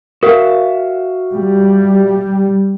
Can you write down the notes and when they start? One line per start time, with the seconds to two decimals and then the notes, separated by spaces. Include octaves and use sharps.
0.23 F#4 A#4 E5 F5
1.34 G3